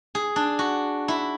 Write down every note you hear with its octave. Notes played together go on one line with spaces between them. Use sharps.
G#4
D4
F#4
E4